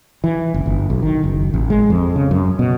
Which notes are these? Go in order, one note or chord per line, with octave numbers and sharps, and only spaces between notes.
E3
F#1
G1
B1
D#3
F#1
A1
G#3
F2
C#3
F#2
B2